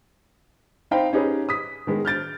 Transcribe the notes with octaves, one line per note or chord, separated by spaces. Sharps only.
C4 D#4 C5 F5 G5 B5
C#4 D#4 G4 G#4 B4
D#6 B6
D#3 G#3 B3
F6 G6 A6 D7